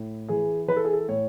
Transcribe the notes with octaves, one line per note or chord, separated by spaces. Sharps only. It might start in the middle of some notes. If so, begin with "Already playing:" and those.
Already playing: A2
E3 G#4
E3 B4
A4
G#4
A4
A2 C#5